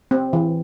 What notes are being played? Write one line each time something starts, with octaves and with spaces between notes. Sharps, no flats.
C4
E3